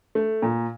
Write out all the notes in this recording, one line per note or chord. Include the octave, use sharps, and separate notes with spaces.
A3
A#2